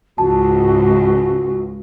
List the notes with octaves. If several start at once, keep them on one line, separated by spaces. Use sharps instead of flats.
C#2 G#2 F#4 A5